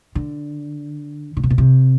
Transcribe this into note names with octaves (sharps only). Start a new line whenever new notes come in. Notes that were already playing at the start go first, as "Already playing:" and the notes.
D3
D3
C3
B2
C3